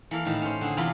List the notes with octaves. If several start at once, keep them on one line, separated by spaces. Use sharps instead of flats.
E3 A#3 A4 F5
A2 D#3 A5
C#4 C5
D3 C4 D4 G#4
E2 C3 F4 B5 C6